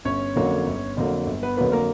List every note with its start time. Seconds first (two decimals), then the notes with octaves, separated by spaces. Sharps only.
0.05 G1 C#4 C#5
0.36 F2 D3 F#3 A#3
0.66 G1
0.97 F2 D3 F#3 A#3
1.26 G1
1.43 B3 B4
1.57 F2 D3 F#3 A#3 B3 B4
1.72 A#3 A#4